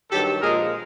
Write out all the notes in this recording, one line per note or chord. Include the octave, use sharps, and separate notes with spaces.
G2 D#3 F#3 G4 A4
A#2 F3 G#3 G#4 A#4